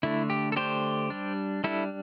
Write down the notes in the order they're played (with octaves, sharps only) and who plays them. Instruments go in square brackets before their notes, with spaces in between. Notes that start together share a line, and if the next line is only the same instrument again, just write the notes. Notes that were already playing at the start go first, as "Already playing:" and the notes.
[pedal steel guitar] D3 A3 D4 E4
G4
A4
D3 A3 D4 G4 C5
G3 D4
G3 D4 E4 A4